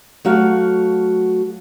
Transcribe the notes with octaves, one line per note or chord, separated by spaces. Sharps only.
F#3 A3 F#4 F5